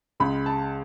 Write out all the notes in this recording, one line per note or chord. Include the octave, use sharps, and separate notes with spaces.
C#2 C#3 G#3 B5
A5